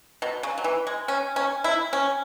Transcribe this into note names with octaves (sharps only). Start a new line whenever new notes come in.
B2
C#3
F#3
E3
G#3
C#4
C#4
E4
C#4